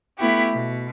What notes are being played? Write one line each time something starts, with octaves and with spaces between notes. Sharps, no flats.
A3 B3 E4 F#4 G4
B2